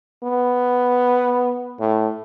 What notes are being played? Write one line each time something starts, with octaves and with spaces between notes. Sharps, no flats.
B3
A2